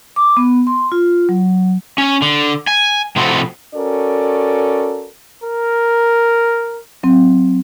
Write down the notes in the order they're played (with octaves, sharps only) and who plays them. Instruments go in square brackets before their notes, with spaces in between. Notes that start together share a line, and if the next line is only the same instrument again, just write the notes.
[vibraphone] D6
B3
C6
F4
F#3
[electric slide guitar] C#4
D3
G#5
A2 C3 F3 C4 F#4 A4
[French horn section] C#4 F#4 A4 A#4 D5
[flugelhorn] A#4
[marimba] F#3 C4